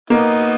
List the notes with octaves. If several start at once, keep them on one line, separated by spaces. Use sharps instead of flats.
A#3 B3 D#4